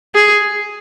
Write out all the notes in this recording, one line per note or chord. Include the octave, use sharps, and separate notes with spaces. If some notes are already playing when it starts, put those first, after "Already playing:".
G#4